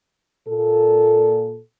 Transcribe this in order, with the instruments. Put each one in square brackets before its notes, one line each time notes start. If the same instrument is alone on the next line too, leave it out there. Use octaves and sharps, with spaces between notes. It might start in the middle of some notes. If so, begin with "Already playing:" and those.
[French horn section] A#2 A4